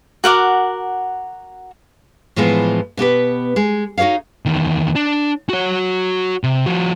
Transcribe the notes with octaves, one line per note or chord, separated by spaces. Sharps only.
F#4 A#4 F#5 D6
A2 E3 F3 G#3 B3
B2 B3 G4 B4
G#3
D#4 F#4 A4 C#5 F5
E2 D#3
D4
F#4 C#5
C3
F3 F#4